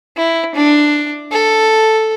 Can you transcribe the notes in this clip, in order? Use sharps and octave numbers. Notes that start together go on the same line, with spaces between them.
E4
D4
A4